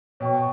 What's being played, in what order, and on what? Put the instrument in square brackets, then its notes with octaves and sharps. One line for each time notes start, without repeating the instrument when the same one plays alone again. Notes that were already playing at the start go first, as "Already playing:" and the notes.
[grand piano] B2 [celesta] C#5 G5 C#6